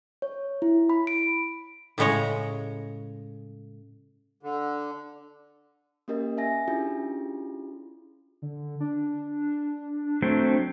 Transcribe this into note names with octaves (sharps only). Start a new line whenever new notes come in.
C#5
E4
B5
D7
A2 C#3 G#3 C#5 D#5
D3
A#3 C#4 G4 A#4 D#5
E5 G#5 A#6
C#4 D4 E4 F4 G4 G#4
D3
D4
F#3 A3 C4